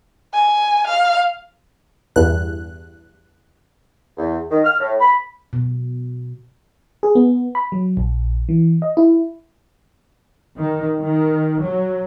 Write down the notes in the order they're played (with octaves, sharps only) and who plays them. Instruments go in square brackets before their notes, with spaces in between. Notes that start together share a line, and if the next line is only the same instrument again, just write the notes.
[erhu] G#5
F5
[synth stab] E2 G2 F#6
[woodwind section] E2
D#3
F6
A2
B5
[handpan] B2
[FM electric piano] G#4
B3
B5
F#3
A#1
E3
D#5
E4
[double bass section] D#3
D#3
F#3